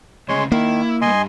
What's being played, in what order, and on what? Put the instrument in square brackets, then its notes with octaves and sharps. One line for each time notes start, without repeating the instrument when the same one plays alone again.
[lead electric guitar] D2 C#3 [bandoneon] G#3 C#5 C6
[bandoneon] D#3 [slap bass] A#3 [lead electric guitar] E4
[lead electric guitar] C#2 G2 [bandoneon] D#5 G#5 C6